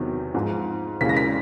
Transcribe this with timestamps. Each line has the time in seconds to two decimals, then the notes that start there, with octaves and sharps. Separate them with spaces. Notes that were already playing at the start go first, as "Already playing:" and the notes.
Already playing: E2 C3 D#3 F#3
0.35 G#2 F3 G#3
1.01 D#2 C#3 E3 G#3 B6
1.09 A#6
1.17 B6